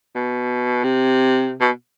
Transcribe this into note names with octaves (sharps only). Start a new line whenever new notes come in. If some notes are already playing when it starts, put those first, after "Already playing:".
B2
C3
B2